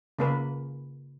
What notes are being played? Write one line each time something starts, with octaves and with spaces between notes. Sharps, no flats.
C#3 A#3 B4